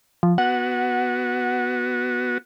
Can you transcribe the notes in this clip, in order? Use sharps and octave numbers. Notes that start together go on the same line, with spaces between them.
F3
B3 F#4 F#5